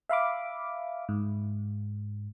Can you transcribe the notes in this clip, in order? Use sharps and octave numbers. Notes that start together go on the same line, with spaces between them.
E5 F5 B5 D6
G#2